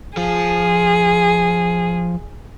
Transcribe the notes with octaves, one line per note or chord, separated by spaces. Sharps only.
F3 F4 G#4